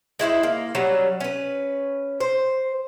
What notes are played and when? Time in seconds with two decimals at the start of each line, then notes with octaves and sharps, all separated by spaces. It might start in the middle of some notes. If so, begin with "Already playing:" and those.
0.19 G#3 E4 F4 C5
0.43 A#3
0.75 F#3 G3 C#4
1.20 C#4 B4
2.20 C5